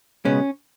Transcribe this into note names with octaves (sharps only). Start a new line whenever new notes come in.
C#2 B2 G#3 B3 C#4